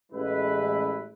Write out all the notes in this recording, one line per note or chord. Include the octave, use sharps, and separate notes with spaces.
A1 G#3 E4 B4